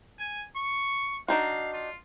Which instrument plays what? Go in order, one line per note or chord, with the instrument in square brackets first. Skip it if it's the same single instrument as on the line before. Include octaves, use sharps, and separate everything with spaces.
[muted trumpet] G#5
C#6
[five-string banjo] D4 D#4 F#4 [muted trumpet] F5
[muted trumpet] F4